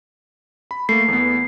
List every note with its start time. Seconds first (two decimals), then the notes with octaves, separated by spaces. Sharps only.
0.71 B5
0.89 A3 A#3 C7
1.08 E2 B3